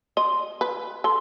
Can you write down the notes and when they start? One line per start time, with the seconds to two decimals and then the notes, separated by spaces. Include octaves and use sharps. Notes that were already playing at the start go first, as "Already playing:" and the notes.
0.17 D#5 C6
0.61 B4
1.04 A4 C6